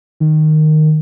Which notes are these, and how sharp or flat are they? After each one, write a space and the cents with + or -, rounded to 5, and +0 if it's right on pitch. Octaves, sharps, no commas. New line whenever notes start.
D#3 -10